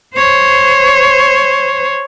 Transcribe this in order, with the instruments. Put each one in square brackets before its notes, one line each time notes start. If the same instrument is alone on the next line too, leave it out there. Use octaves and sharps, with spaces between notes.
[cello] C5 C#5